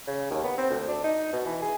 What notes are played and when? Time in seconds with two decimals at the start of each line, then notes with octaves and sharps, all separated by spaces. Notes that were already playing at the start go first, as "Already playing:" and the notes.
0.07 C#3
0.30 D#2
0.44 B3
0.58 C4
0.70 D2
0.88 D4
1.04 D#4
1.33 B2
1.46 E3
1.62 G#4